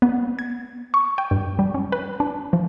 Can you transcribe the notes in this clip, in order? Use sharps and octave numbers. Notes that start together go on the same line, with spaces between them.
B3
G#6
C#6
G5
G2
G3
C#4
B4
D4
F3